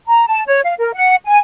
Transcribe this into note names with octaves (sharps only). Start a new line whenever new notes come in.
A#5
A5
C#5
F5
A#4
F#5
G#5